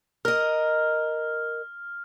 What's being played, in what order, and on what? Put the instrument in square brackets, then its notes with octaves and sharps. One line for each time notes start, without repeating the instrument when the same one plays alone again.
[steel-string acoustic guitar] A#4 D#5 [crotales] F6